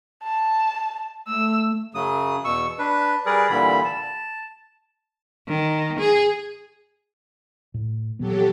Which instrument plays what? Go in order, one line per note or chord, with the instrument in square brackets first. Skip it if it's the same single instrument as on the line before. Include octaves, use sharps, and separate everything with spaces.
[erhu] A5
[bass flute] A3 [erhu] E6
[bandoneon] F#2 C#3 F#3 D#6
E2 B2 C#6 E6
D4 B4
G3 G#4 A#4 B4 D5
A#2 D3 E3 G3 B5
A5
[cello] D#3
G#4
[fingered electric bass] A2
[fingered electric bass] A#2 E3 B3 [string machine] F#3 G4 A4